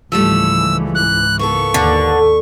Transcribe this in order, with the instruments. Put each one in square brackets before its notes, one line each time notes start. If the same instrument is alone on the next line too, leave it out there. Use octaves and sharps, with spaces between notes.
[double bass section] C#2 G#2 E3 [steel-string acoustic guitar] F3 G3 A3 [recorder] E6
[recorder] F#6
[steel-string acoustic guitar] A#3 B3 A4 [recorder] C#6
[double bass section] D#2 [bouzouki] D3